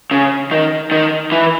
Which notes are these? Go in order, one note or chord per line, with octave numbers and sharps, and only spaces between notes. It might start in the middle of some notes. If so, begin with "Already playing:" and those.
C#3
D#3
D#3
E3